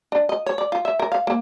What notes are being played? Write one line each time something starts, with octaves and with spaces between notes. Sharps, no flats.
D4
D#5
C#5
D5
F4
E5
A#4
F5
A#3